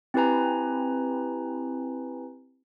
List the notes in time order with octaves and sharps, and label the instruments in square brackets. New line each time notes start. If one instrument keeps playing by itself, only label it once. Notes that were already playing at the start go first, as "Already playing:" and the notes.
[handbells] C4 E4 G4 B4 G#5 A#5